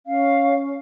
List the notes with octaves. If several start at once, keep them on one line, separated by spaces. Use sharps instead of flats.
C#4 F5